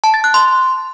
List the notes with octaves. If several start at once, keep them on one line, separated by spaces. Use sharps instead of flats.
A5
A6
F#6
C6